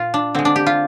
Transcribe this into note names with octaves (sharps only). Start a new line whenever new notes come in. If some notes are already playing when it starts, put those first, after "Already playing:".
Already playing: A#2 F4
D4
D3 G#3 C4
D4
G4
F4